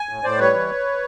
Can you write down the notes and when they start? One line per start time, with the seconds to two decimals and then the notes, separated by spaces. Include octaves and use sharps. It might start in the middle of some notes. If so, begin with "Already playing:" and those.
Already playing: G#5
0.09 A2
0.23 A2 C5 D5
0.39 G3 B4 C#5
0.54 E3